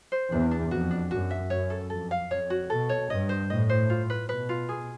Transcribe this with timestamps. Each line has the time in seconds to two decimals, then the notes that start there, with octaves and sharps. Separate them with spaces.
0.12 C5
0.31 E2 D4
0.51 D4
0.71 F2 F#4
0.91 D4
1.11 F#2 F#4
1.31 E5
1.50 F#2 C#5
1.70 A4
1.90 F2 A4
2.11 F5
2.31 F2 C#5
2.50 F#4
2.70 B2 A4
2.89 C#5
3.09 G2 D#5
3.29 C5
3.49 A2 D#5
3.70 C5
3.90 F4
4.10 B4
4.29 B2 B4
4.49 F4
4.69 G#4